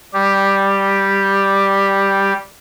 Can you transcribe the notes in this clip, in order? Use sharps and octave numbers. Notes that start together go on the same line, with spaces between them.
G3 G4